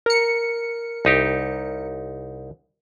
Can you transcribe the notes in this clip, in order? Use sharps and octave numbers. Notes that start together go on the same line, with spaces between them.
A#4 C#7
C2 D#4 G4